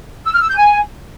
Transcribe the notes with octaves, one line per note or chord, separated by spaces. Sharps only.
E6
F6
E6
G6
G#5